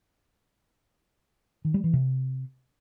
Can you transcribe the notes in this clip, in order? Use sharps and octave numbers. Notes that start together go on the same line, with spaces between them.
D#3
G3
E3
C3